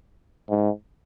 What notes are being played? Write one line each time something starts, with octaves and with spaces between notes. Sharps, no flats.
G#2